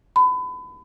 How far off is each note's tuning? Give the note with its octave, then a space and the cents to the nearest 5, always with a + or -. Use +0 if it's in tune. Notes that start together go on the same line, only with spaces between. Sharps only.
B5 +30